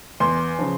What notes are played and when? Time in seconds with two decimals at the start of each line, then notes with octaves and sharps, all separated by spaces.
0.20 E2 C6
0.59 C#3 F3